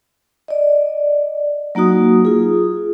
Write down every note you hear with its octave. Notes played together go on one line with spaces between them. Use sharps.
D5 D#5
F#3 A#3 D#4 F#4 D#6
F4 G#4